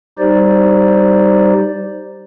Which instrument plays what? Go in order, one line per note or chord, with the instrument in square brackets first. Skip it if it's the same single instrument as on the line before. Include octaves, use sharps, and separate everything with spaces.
[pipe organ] G3 D#4 G4 C5 D5